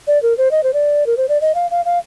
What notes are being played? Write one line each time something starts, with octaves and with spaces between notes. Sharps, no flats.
D5
A#4
C5
D#5
C5
D5
A#4
C5
D5
D#5
F5
F5
F5